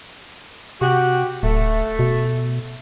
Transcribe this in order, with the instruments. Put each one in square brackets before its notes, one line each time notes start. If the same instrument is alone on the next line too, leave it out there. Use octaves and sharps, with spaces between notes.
[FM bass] C3 [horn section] F#4 G4
[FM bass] D1 [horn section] A3
[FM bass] B2